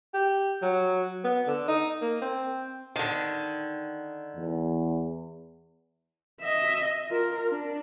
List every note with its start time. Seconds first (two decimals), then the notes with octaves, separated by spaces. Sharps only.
0.14 G4
0.62 F#3
1.24 B3
1.47 D3
1.68 D#4
2.01 A#3
2.21 C4
2.96 D3 D#3
4.36 E2
6.41 D#5 E5
7.09 F4 A#4
7.50 D4